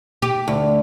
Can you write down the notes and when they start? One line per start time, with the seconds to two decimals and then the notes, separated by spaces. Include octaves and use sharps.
0.22 G4
0.48 D2